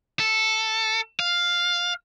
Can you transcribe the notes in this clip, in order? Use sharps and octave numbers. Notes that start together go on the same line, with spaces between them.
A4
F5